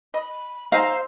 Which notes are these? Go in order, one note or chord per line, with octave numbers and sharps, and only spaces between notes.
D#5 B5
D#4 G#4 C5 F5 A#5 E6